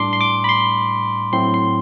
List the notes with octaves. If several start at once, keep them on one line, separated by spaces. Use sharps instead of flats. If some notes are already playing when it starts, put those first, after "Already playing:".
Already playing: A2 G3 D4 C6 D6
C6
D6
B5
C6
A2 F#3 C4 E4 C6
C6